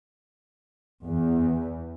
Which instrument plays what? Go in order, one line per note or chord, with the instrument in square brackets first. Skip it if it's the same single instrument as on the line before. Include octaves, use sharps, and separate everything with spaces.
[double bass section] E2